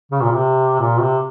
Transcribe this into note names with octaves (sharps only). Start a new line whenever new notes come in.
C#3
A#2
C3
A#2
C3